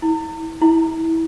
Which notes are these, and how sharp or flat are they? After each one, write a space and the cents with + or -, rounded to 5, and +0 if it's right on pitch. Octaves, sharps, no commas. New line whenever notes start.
E4 -35
E4 -20